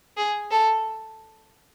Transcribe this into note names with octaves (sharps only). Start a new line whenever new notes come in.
G#4
A4